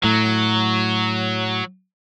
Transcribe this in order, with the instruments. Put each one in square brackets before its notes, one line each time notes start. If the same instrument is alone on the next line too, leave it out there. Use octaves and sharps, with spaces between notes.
[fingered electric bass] A2 [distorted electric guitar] F#3